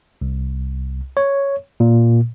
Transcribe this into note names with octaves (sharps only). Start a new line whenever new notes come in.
C2
C#5
A#2